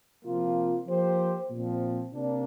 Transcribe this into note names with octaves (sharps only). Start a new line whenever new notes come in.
C3 F3 A#3 F4
F3 A#3 G4 C5
A#2 F3 C4
C3 A#3 D4